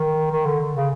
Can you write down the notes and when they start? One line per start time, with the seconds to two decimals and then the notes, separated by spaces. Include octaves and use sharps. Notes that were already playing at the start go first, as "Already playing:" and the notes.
Already playing: D#3
0.31 D#3
0.45 D3
0.75 C#3